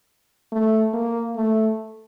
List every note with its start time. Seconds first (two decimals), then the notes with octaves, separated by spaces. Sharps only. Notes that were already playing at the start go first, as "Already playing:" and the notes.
0.52 A3
0.94 A#3
1.36 A3